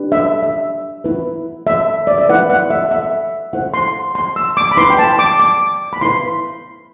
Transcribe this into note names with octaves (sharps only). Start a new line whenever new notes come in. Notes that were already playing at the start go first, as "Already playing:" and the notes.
Already playing: D4 G4 B4
E5
E5
E4 B4
E5
D5
E5
E4 B4 F#5
F#5
E5
E5
E4 A4 C5 F#5
C6
C6
E6
D6
B5
E4 B4 C6
G5
A5
D6
D6
B5
E4 B4 C6